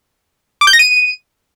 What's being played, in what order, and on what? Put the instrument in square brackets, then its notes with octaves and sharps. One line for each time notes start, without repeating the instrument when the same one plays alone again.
[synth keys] D6
G6
A#6
D#7